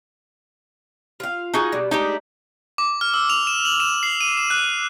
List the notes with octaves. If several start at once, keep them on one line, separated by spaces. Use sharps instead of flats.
F4 F5
D#4 F#4 G#4
B2 G3
G#3 A3 D4 D#4 G4
D6
F6
E6
F7
E7
F#7
E7
C7
D#7
E7
F#6